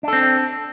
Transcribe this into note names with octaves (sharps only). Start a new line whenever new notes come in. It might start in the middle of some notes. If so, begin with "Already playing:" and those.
C4 D4 A4